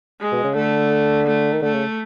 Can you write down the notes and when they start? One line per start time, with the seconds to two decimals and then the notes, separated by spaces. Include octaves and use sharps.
0.20 G#3
0.32 B2
0.44 C#3
0.55 D3 A3
1.27 A3
1.53 D#3
1.62 D3 A3
1.74 C#3